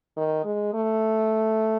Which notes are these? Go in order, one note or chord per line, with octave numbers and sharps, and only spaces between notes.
D#3
G#3
A3